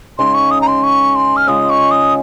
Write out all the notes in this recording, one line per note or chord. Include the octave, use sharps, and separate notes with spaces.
C#3 G#3 D#4 G#4 C6
C#6
D#6
A#5
C6
C#6
C6
F6
C#3 G#3 C#4 F4 D#6
C#6
D#6